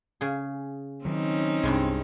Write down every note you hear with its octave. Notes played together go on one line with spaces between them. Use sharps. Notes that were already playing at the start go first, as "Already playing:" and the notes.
C#3 G#4
D#3 F#3 C4 C#4 D#4
C2 G2 C3 G#3